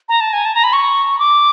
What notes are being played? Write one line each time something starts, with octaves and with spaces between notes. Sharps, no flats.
A#5
A5
G#5
A5
A#5
B5
C#6
D6